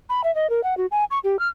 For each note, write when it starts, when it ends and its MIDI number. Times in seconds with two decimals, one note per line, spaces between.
0.09 0.22 83
0.24 0.34 76
0.35 0.50 75
0.50 0.63 70
0.63 0.77 78
0.77 0.86 66
0.91 1.04 80
1.11 1.19 85
1.24 1.39 67
1.39 1.48 89